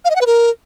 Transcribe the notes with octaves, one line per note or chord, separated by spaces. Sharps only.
F5
D#5
F#5
B4
A#4